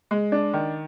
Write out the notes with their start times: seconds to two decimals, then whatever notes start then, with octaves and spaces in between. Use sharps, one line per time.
0.11 G#3
0.32 D4
0.53 D#3